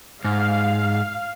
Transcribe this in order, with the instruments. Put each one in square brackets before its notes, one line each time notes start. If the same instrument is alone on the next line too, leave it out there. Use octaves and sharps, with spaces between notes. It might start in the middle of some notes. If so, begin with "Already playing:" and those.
[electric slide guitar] G#2 [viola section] F5